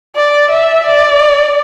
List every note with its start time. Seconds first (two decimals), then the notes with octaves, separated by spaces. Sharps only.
0.16 D5
0.51 E5
0.86 D5